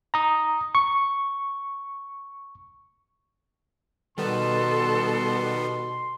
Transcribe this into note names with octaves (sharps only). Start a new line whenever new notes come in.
A#5 D#6
C#6
B2 D#3 G3 B3 A4 C6